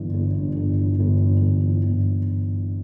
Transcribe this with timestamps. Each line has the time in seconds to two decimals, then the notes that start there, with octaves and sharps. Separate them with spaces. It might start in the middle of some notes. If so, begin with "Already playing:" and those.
Already playing: G1 G2 E3
0.13 G1
0.35 G2
0.56 G1
0.78 E3
0.99 G1
1.20 G2
1.42 G1
1.63 E3
1.84 G1